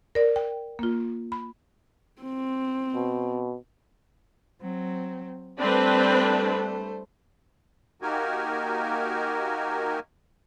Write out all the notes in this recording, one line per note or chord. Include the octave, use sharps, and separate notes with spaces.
A#4 D5
G5
A#3 F4
B5
C4
B2
F#3 C4
G3 A3 C4 D4 B4 C5
A#3 D#4 F#4 G4 A#4 G#5